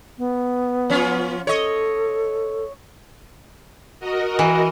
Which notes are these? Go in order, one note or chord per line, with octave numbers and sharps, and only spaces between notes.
B3
F3 C#4 F4
A4 C#5 D#5
F#4 A#4 D#5
E3